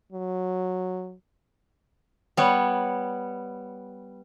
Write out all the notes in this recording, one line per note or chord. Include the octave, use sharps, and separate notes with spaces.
F#3
G3 B3 C#5